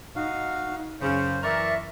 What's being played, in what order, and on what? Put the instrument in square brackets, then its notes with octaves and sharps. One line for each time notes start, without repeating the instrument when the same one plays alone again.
[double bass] D#4 [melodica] F#4 F5
[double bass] F#2 [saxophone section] C#3 [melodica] C5
[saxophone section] E3 A#4 [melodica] D5 C#6 [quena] E5